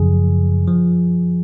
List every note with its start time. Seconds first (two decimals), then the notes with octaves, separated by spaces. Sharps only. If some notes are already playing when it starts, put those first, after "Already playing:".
Already playing: F#2 C#3 F3 G#4
0.68 F3